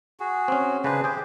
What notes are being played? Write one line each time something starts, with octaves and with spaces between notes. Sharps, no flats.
F#4 G#4
C4 C#4
C#3 D4 G#4 B4 C5
G4 G#4 C5 G5